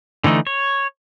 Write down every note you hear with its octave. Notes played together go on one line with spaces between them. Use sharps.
D3 E3 A3 D#4
C#5